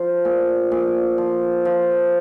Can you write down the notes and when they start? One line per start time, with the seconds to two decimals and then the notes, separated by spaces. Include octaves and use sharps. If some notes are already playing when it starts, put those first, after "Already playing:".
Already playing: F3
0.25 A#2
0.72 A#2
1.18 F3
1.65 F3